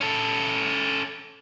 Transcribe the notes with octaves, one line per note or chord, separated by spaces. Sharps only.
C#4 A4